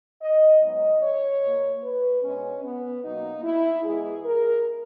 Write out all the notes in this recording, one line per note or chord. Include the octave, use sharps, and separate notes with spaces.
D#5
G#2 F#3 B3 D#5
C#5
A#2 A#3
B4
B2 G#3 B3 C#4
B3
B2 F#3 A#3 D#4
E4
G#2 E3 G#3 B3 G#4
A#4